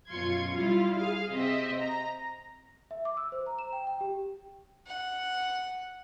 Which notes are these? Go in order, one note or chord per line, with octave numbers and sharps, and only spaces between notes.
F#2 B2 F4 C6 G#6 C#7
G3 E4 F4 F5
G#4 F5
C3 C4 D#5 E5
A#5
E5
D6
E6
C5
A#5
E7
G5
G5
G4
F#5